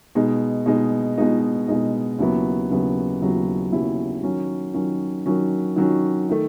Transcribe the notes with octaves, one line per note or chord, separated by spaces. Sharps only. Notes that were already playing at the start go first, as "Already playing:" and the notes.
B2 G#3 D#4
B2 G#3 D#4
B2 G#3 D#4
B2 G#3 D#4
D#2 C#3 F#3 B3 E4
D#2 C#3 F#3 B3 E4
D#2 C#3 F#3 B3 E4
D#2 C#3 F#3 B3 E4
D#3 F#3 C#4
D#3 F#3 C#4
D#3 F#3 C#4
D#3 F#3 C#4
D#3 A3